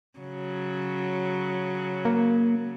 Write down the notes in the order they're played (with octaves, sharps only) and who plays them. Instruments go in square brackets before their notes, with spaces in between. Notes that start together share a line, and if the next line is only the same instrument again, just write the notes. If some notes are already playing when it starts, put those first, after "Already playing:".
[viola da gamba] C#3 F#3
[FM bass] A#3